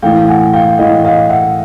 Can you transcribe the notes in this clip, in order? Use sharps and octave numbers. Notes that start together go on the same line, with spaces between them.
A2 E3 A3 F5 G5
F#5 G#5
F5 G5
A2 E3 A3 D#5 F5
D#5 F5
E5 F#5